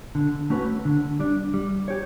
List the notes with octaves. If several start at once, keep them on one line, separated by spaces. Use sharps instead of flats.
D3
A3 C#4 F#4 B4
D3
G3 D4
G3
G4 C#5